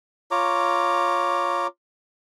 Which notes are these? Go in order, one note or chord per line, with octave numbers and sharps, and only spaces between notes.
F4 C#5 A#5 D6